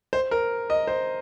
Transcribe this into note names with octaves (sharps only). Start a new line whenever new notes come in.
C5
A#4
D#5
C5